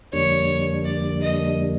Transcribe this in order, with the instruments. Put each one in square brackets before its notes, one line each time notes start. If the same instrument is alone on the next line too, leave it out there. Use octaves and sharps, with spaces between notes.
[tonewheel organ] F2 D3 G3 A#3 D4 [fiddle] C#5
[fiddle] D5
D#5